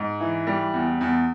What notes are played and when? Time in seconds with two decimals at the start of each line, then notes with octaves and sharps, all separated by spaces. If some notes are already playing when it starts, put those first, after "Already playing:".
Already playing: G#2
0.20 E3
0.47 G3
0.74 E2
1.01 E2